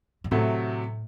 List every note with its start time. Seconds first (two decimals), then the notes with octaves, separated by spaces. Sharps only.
0.24 G2
0.31 A2 C3 F#3 A3